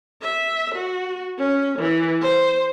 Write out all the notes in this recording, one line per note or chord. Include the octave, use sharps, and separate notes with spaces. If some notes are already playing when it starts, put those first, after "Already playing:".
E5
F#4
C#4
E3
C5